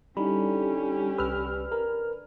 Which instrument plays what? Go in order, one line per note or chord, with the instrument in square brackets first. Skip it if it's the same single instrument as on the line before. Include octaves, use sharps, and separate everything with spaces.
[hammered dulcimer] D3 [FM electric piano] G3 [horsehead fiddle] C#4 G4 [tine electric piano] D#4 E4 B5
[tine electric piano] C2 E6 [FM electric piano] B4 F6
[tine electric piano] A#4 [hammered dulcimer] G#5 B5